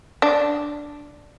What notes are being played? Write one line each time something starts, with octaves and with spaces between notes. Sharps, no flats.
D4